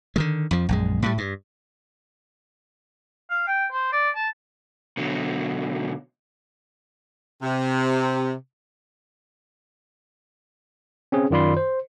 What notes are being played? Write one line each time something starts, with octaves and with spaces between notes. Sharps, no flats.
D3 D#3 G#3
F2 F3
A#1 F#2 G#3
A2 G3
G2
F5
G5
C5
D5
A5
B2 D3 F#3
C3
C4 C#4 G#4
F#2 D#3 F4 D5 B5 C6
C5